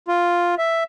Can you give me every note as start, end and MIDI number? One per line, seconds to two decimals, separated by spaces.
0.08 0.55 65
0.58 0.84 76